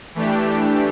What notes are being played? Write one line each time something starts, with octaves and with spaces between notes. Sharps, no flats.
E3 A3 D4 G4